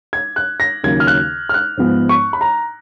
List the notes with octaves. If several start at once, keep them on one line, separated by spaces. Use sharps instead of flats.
G#6
F#6
A#6
D#2 C#3 F#3 A#3 G#6
F6
F#6
F6
F#6
G#2 F3 B3
C#6
B5
A#5